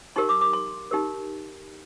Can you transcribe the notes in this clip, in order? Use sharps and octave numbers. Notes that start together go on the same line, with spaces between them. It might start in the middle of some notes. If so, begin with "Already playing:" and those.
D#4 G4 A#4 C6
D6
D6
C6
D#4 G4 A#4